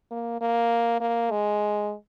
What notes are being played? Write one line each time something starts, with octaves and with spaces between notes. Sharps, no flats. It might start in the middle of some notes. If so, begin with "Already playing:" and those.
A#3
A#3
A#3
G#3